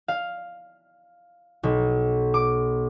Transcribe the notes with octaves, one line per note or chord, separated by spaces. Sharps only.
F5
B1
D6